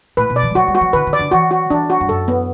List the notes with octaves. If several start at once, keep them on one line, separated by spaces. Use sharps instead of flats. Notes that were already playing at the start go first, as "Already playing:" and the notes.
A2 B4
B2
D5
E3
G3
F#3 F#4
G3
F#4
F#3
D3 B4
D3
D5
D3
E3 F#4
F#4
E3 D4
F#4
G2
F#2 A4
B3